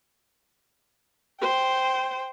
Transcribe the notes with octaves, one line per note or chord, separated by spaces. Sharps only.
C5 G5